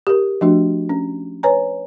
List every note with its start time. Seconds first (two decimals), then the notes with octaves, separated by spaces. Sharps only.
0.07 G4 A#4
0.41 F3 A3 D4 F#4 E5
0.89 C#4
1.43 B4 C#5 G#5 A#5